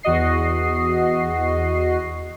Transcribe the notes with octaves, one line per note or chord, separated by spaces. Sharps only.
E2 F#4 D#5 C7